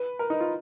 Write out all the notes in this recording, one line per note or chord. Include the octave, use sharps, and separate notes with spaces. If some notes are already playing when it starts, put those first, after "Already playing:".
Already playing: B4
A#4
D#4
F4